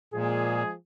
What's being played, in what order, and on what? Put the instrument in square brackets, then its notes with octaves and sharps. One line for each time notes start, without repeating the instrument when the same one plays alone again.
[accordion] A#2 [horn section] F3 G#3 G#4